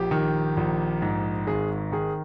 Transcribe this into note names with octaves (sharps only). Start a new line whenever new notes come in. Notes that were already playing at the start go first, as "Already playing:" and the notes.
Already playing: A#1 G4
D#3
A#1
G#2
G#1 G#4
D#3 G#4